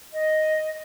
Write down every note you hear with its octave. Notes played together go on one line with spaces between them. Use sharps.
D#5